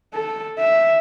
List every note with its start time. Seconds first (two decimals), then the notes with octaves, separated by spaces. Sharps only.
0.14 A4
0.59 E5